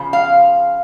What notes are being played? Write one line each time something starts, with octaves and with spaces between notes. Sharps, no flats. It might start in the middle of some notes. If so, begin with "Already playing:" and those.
Already playing: C#3 F3
F5